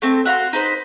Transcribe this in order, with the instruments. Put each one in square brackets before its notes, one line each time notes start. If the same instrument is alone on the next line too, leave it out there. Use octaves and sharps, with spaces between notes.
[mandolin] A3 C4
F#4 E5 F5 C6
D#4 B4 C5